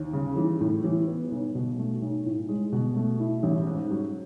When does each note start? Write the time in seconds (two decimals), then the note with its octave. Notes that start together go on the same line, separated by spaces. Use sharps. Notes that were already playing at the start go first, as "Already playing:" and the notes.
Already playing: D#2
0.13 C#3
0.36 E3
0.61 A2
0.84 E3
1.07 B3
1.31 B1
1.55 B2
1.78 A3
2.02 B1
2.26 A2
2.49 G#3
2.72 B2
2.96 A3
3.20 E4
3.43 A1
3.67 G#2
3.91 F#3